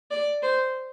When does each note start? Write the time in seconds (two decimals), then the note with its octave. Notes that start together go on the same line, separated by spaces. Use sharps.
0.11 D5
0.42 C5